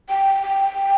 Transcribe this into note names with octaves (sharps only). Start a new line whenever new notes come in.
G5
G5